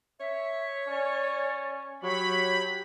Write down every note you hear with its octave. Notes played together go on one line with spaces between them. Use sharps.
C#5 E5
C#4 D5
F#3 G4 C#5 B5